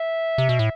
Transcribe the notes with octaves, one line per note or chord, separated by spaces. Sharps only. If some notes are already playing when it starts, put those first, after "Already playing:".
Already playing: E5
C3
B2
A2